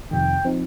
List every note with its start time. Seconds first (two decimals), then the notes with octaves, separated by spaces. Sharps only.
0.11 F2 C3 D#3 G5
0.45 F3 C4 D#4